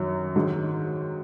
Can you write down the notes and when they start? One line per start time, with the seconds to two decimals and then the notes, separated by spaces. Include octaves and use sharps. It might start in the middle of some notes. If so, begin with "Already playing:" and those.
Already playing: F#2 D#3 F#3
0.36 G#2 D#3 F#3